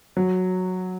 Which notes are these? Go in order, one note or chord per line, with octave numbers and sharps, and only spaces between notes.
F#3